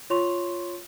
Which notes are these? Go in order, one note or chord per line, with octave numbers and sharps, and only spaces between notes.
F4 C#5 C6 C#6 F7